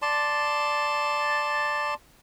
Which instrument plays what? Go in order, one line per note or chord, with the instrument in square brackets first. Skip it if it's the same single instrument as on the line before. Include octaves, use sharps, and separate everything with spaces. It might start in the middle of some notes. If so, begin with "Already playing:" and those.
[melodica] D5 A5 C6